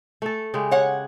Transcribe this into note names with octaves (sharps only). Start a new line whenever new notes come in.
A3 A4
C#3 G#3 G4
C#5 F#5